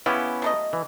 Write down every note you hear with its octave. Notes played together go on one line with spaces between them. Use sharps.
C#3 B3 C#4 E4 G4
F#3 A3 D#5
E3